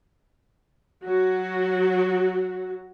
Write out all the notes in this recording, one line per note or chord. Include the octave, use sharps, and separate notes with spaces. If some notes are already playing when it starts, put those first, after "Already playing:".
F#3 F#4